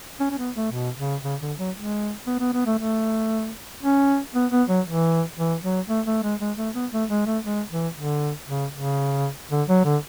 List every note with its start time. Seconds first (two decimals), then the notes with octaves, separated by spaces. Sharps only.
0.20 C#4
0.30 C#4
0.38 B3
0.55 A3
0.72 B2
0.98 C#3
1.23 C#3
1.41 D3
1.58 F#3
1.76 G#3
2.27 B3
2.40 B3
2.54 B3
2.66 A3
2.79 A3
3.83 C#4
4.34 B3
4.51 B3
4.69 F#3
4.86 E3
5.37 E3
5.62 F#3
5.89 A3
6.06 A3
6.23 G#3
6.40 G#3
6.57 A3
6.74 B3
6.92 A3
7.10 G#3
7.26 A3
7.44 G#3
7.70 E3
7.95 D3
8.48 C#3
8.73 C#3
9.51 D3
9.68 F#3
9.85 D3